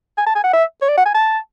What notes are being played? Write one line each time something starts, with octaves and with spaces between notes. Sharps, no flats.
G#5
A5
G#5
F#5
E5
C#5
D5
F#5
G#5
A5